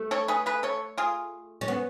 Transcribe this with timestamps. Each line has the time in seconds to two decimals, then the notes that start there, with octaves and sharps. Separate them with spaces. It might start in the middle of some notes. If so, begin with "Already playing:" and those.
Already playing: A3
0.11 A4 C#5
0.28 G#4 B4
0.46 G#4 B4
0.63 A4 C#5
0.98 F4 G#4
1.61 C#4
1.68 B3